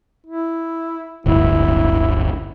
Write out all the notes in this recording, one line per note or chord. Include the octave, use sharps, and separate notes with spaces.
E4
D1 G1 E4